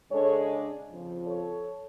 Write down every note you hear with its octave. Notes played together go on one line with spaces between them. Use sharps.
C#3 G#3 D4 A4 C#5
F2 C#3 F3
A4 C#5